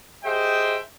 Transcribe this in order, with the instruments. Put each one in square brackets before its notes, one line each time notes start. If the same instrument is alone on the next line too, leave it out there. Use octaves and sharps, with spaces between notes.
[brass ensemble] G4 G#4 C5 D#5 E5 G5